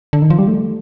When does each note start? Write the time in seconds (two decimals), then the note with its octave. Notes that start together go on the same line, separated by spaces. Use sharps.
0.13 D3
0.22 D#3
0.30 F3
0.39 G3
0.48 A3